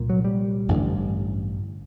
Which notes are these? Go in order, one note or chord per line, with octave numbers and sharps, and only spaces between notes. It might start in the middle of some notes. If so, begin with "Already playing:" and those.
Already playing: C2 A#2
F#3
G3
A1 G2 D3